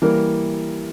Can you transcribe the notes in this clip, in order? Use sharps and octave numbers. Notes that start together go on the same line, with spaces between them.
E3 G3 A#3 A#4